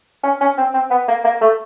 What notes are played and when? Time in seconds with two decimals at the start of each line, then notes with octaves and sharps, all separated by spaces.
0.23 C#4
0.41 C#4
0.58 C4
0.74 C4
0.90 B3
1.08 A#3
1.24 A#3
1.41 A3